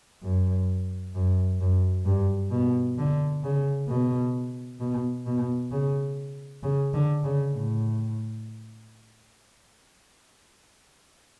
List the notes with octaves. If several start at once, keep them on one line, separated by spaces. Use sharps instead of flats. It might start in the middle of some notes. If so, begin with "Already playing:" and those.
F#2
F#2
F#2
G2
B2
D3
C#3
B2
B2
B2
C#3
C#3
D3
C#3
A2